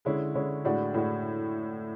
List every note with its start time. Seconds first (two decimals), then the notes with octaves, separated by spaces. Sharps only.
0.05 D3 G#3 C#4 E4
0.35 D3 G#3 C#4 E4
0.65 A2 G#3 D4 F#4
0.94 A2 G#3 D4 F#4